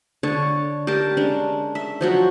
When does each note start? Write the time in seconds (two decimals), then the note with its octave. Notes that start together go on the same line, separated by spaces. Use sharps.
0.23 D3 C#5 A5
0.87 G4 A#4 A5
1.17 G#3 C#4 D4
1.75 E5
2.01 F3 F#3 F#4